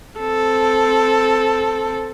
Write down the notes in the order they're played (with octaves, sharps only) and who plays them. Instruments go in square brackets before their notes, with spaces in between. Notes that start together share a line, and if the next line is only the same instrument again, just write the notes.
[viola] C4 A4